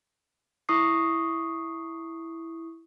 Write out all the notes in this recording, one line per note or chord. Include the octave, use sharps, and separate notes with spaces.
E4 C#6 D#6 C7